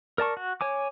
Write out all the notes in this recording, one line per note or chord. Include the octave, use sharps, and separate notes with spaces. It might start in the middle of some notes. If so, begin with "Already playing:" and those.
A#4 D5 A5 C#6
F#4
C#5 G#5 D6